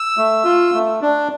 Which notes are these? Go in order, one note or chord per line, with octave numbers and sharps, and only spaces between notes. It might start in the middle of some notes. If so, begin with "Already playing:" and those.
Already playing: E6
A3
F4
A3
D4